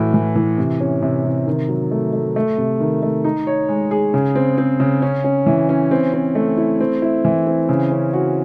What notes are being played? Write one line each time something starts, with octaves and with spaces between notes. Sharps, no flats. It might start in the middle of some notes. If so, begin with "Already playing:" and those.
Already playing: A2 E3 F#4
E3
E3
C3
C#4
C3
C3
D#3
F#3
A3
A3
A3
C3
D#3
A3
D#4
C#5
G#3
G#4
C#3
C4
C4
C#3
C#4
C#4
E3
C#4
C4
C4
A3
E4
C4
E4
E3
C4
C#3
C#4
F#4